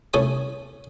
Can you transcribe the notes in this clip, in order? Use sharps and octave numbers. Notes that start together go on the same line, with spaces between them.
C2 A3 C#4 A4 G#5 D#6